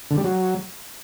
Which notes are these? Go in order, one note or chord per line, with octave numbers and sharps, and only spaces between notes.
D3
G3
F#3